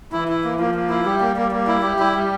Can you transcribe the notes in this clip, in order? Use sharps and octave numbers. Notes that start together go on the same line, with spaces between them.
E3 E4
E4
A#3
F3 A#3
A#3
E4
G3 G4
A#3
A#3
A#3
E4
G4
G3 E4
G4